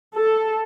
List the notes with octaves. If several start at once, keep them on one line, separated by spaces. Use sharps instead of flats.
A4